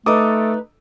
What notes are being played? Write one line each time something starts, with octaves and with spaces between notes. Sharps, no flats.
A3 D#4 A4 B4 D6 D#6